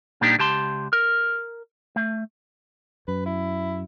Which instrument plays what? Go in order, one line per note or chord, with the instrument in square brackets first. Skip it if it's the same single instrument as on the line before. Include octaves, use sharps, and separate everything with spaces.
[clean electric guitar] A#2 G3 A#3 D4 D#4 G4
C#2 G4 A5 C6
A#4
A3
[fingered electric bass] F#2 [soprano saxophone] B4
[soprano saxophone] E4